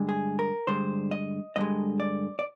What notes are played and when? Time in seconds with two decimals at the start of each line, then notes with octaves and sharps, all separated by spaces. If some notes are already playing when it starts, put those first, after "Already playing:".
Already playing: G2 D3 G#3
0.09 G#4
0.39 A#4
0.67 G2 D3 G#3 C5
1.11 D#5
1.56 G2 D3 G#3 D#5
2.00 D5
2.39 D5